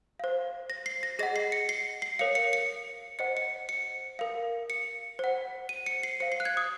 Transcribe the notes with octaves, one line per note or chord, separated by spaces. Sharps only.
C5 F5
A#6
C7
A#6
G#4 D#5 F#5 A#6
C7
C#7
C7
C7
A#4 C#5 F5 C#7
C#7
C#7
C5 D#5 F#5 C#7
C#7
C#7
A#4 F5
C#7
C5 F#5
D#7
C#7
C7
C5 F5 C#7
C7
F#6
G#6
D#6